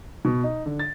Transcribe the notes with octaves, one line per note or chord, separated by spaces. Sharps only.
B2
D#4
D3
A6